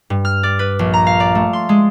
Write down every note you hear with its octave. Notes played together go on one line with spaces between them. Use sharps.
G2
F6
D5
B4
A#1
A#5
F5
D5
A3
C6
G#3